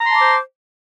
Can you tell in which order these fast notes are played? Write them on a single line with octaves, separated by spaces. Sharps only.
A#5 C6 A5 D6 C5